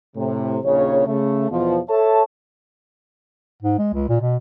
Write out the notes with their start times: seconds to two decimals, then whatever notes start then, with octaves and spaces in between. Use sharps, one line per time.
0.16 A2 C3
0.64 A#1 D#2 C#3 C#5
1.07 C#3 A3
1.51 E2 B2 F3
1.89 A4 C#5 E5 A5
3.62 G#2
3.78 G#3
3.93 C#2
4.09 A#2
4.21 B2